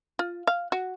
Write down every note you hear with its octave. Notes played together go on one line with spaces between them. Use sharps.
F4
F5
F#4